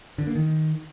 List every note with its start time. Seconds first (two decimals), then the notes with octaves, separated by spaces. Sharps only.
0.18 D3
0.27 A#3
0.35 D#3